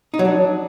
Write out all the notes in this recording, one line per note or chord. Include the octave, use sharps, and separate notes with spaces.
D#4
F#3
D4